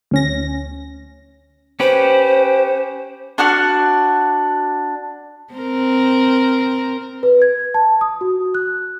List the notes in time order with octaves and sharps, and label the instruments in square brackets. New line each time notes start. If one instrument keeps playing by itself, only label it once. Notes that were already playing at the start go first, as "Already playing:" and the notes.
[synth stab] D2 C#4 A#6
[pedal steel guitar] C#4 G4 B4 [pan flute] C5
[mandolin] D4 F#4 F#5 F6
[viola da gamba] C4 A#4
[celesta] B4
G#6
A5
D#6
F#4
F#6